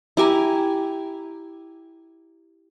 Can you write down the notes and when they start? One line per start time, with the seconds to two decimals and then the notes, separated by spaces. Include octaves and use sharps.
0.17 E4 G4 G#5 A#5